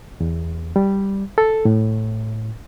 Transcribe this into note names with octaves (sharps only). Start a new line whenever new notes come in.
E2
G3
A4
A2